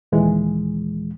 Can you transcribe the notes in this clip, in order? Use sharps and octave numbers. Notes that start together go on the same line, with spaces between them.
D#2 A#2 E3 G#3